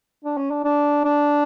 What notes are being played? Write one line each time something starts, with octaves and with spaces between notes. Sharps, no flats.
D4
C#4
D4
D4
D4